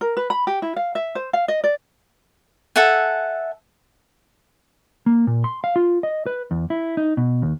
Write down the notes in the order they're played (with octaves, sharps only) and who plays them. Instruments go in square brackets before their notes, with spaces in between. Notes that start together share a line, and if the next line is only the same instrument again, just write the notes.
[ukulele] A#4
B4
B5
G4
E4
F5
E5
C5
F5
D#5
D5
[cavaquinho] A4 E5 F#5 G#5
[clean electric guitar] A#3
A#2
C6
F5
F4
D#5
B4
E2
E4
D#4
B2
D#2